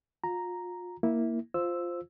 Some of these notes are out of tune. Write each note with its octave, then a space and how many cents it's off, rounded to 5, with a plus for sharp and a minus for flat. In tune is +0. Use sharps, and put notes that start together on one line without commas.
F4 +35 A#5 +0
A#3 +0 E4 -10
F4 +0 C5 +0 E6 +0